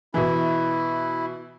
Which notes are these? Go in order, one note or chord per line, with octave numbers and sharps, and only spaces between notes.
B2 E3 E4